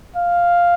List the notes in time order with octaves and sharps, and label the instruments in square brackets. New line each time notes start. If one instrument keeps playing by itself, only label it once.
[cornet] F5